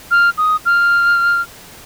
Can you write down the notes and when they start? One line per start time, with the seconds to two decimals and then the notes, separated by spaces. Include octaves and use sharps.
0.11 F6
0.37 D#6
0.66 F6